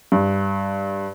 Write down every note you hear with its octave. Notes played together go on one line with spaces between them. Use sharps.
G2